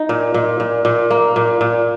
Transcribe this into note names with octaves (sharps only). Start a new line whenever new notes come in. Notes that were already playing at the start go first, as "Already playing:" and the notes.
Already playing: D#4
A#2
A#2
A#2
A#2
A#3
A#2
A#2